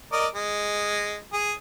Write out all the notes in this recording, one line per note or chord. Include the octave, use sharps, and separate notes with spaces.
A#4 D5 D#5
G#3
G#4